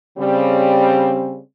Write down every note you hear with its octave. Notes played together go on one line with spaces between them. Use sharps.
C#3 G3 C4